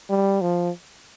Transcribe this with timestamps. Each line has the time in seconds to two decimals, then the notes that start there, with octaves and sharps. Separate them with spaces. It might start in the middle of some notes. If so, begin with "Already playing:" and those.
0.10 G3
0.42 F3